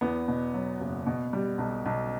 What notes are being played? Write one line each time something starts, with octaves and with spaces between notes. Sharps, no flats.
E2 B3
B2
F#3
F#1
B2
G3
B1
B1